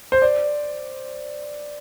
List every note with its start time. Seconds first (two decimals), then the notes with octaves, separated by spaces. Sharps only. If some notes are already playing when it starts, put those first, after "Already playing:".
0.12 C5
0.22 D5